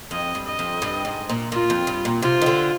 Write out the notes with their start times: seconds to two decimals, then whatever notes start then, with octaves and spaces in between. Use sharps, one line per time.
0.11 F2 D#5
0.35 G2
0.47 D#5
0.59 F2
0.82 G2
1.05 G#2
1.29 A#2
1.52 A#2 F4
1.70 F2
1.87 G2
2.05 A#2
2.22 C3 F4
2.42 D#3
2.46 D3